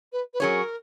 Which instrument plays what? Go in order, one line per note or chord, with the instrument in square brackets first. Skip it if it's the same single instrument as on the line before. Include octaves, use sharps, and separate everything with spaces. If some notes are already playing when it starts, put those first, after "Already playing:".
[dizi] B4
B4
[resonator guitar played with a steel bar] F#3 C#4 G#4 C#5 [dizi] A#4